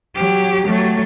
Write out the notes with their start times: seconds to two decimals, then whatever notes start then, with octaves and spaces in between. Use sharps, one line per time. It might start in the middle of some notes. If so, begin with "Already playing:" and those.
0.15 F#3 G4
0.67 F#3 A3